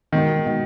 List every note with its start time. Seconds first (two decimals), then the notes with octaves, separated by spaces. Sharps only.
0.12 B2 D#3 G#3 D#4 F#4
0.45 B2 G#3 D#4 F#4